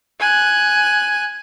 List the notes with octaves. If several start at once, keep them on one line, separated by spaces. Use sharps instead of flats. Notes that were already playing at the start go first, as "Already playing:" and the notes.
G#5 F#6